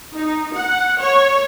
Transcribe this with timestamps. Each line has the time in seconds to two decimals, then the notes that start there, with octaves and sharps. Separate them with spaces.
0.14 D#4
0.55 F#5
1.01 C#5